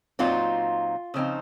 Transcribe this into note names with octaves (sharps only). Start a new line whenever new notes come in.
A#2 F#3 C4 D#4 F4
C#3 F3 C4 D#4